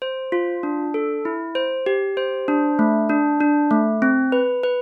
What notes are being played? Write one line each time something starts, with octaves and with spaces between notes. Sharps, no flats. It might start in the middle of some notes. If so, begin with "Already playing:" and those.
C5
F4
D4
A4
E4
C5
G4
C5
D4
A3
D4
D4
A3
C4
B4
B4